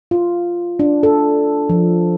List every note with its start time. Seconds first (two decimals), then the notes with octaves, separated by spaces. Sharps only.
0.11 F4
0.79 D4
1.03 A4
1.69 F3